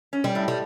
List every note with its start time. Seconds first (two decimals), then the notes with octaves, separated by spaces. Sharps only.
0.13 C#4
0.24 G3
0.35 A2
0.48 G3